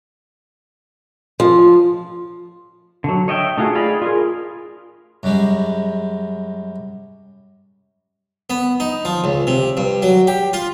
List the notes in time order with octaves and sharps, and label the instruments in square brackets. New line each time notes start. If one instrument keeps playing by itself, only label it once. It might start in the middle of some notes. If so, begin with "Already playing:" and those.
[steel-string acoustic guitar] F3
[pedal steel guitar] D3 F#3
C#5 D#5 E5 G5
A3 D#4 F4 F#4 G#4
G#4 D5 D#5 F5 B5
F4 G#4 A#4
[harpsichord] F#2 G3 G#3
B3
D#4
F3
C#2
C3
G2
F#3
G4
F4